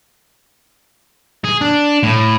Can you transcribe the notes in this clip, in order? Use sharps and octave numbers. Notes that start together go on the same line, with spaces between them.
G#4
D4
A2